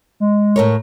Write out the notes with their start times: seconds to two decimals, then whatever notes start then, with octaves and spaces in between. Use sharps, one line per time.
0.20 G#3
0.56 A2 A#4 C#5